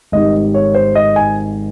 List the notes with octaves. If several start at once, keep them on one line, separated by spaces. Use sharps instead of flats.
G#1 G#2 D#3 G3 D#5
C#5
C5
D#5
G#5